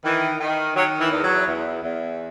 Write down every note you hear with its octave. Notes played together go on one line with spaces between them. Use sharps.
D#3 E3
D#3
D#3 F#3
E3
E2
F#3
E2
E2